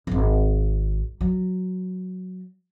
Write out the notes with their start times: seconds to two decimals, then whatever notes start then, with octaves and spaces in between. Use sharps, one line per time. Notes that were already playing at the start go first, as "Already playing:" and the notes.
0.07 D#1 G#1
1.21 F#3